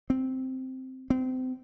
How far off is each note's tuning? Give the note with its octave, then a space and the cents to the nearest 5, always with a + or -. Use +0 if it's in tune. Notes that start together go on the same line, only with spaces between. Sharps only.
C4 -5
C4 -30